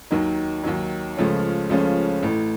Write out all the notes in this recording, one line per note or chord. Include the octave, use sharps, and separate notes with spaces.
D#2 D#3 F#3
D#2 D#3 F#3
C#2 C#3 F3 A3 C#4
C#2 C#3 F3 A3 C#4
A1 A2 A3